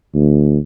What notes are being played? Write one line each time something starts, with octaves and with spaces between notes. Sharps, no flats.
D2